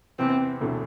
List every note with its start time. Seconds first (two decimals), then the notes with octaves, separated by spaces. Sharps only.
0.19 E2 C3 E3 B3 C4
0.61 E1 D2 C3 E3 A3